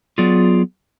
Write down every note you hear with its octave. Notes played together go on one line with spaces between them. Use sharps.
F#3 B3 F4 G#4 D5